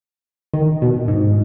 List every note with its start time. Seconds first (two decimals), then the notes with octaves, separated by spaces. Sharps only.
0.53 D#3
0.82 B2
1.08 G#2